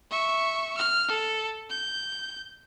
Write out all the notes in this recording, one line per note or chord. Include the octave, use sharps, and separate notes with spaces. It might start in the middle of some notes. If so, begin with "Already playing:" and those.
E5 C#6
F6
A4
G6